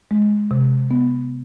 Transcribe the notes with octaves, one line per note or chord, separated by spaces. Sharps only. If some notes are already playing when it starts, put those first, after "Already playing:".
G#3
C3
B3